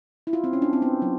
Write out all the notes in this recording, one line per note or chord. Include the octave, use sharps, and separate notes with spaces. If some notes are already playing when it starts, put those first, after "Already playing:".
E4
F4
C4
C#4
D4
C4
B3
F#3